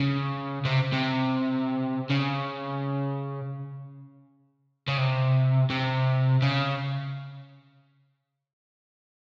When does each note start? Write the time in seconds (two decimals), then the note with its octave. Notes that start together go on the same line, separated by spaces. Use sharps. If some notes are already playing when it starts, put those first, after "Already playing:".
Already playing: C#3
0.65 C3
0.93 C3
2.10 C#3
4.88 C#3
4.98 C3
5.70 C3
6.42 C#3